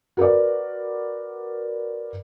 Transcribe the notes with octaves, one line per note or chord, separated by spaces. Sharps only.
F#4 A#4 B4 D5